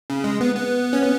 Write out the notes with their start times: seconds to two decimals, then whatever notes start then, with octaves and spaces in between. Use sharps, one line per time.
0.10 C#3
0.24 G#3
0.41 B3
0.55 B3
0.93 C#4
1.03 B3